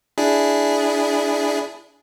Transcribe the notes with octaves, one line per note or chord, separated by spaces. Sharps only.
D4 E4 G#4